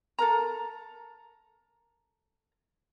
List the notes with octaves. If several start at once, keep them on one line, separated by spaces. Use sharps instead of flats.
A4 A#4 A#5